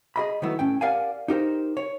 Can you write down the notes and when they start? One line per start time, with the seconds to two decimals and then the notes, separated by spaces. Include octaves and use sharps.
0.16 G#4 D#5 B5
0.42 D#3 F#3 A3 B3 E4
0.59 A2 C#4 G5
0.81 G4 A#4 D5 F5 F#5 G#5
1.28 D#4 G4 A#4 C5
1.77 C#5